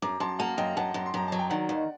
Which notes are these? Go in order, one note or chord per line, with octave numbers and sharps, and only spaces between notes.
F#2 A#5 D6
F#2 A5 C6
A#3 F#5 A5
F#2 D#5 G5
F#2 F#5 A5
F#2
C6
F#2 A#5
F#3 A5
G5
D#3 D5 F#5
D#2